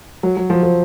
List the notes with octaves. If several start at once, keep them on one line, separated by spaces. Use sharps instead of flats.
F#3
F#3
F3
F3